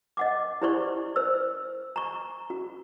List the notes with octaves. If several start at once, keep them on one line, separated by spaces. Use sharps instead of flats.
D#5 F#5 D6
E4 G4 C5 D5 C6 C#6
C5 E6
A#5 C#6
F#4